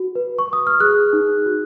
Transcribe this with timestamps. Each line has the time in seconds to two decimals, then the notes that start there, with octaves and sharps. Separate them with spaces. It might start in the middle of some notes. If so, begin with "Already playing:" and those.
Already playing: F#4
0.15 B4
0.39 C#6
0.48 B4 D#6
0.67 F6
0.80 G#4 F#6
1.13 D#4
1.46 F#4